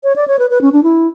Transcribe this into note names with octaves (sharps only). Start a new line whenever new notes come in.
C#5
D5
C#5
B4
B4
C#4
D4
E4